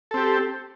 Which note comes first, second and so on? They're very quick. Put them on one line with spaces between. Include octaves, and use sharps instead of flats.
A4 C4 G4